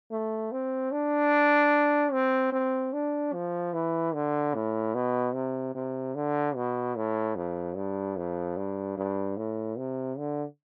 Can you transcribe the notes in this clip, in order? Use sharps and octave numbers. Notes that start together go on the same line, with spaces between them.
A3
C4
D4
C4
C4
D4
F3
E3
D3
A2
B2
C3
C3
D3
B2
A2
F2
G2
F2
G2
G2
A2
C3
D3